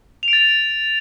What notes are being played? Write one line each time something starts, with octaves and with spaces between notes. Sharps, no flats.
F7
D7
A6